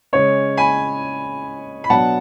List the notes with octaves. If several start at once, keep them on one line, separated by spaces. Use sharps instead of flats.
C#3 G#3 C#4 C#5
G#5 B5
B5
B2 F#3 B3 D4 F#5 A5